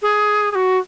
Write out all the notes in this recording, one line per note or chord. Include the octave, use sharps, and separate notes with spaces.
G#4
G#4
F#4